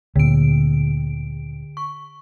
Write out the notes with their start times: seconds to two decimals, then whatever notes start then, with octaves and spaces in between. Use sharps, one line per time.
0.16 D2 A#2 D3 D7
1.77 C#6